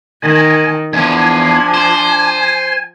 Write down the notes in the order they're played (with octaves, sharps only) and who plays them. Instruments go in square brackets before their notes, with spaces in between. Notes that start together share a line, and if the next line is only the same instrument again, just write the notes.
[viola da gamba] D#3 [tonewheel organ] G#5
[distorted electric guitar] E2 [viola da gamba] F3 [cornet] D4 [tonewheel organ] G#5
[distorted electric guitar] C5